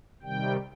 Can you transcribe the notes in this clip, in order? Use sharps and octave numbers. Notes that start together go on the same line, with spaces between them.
C3 D#3 G3 G5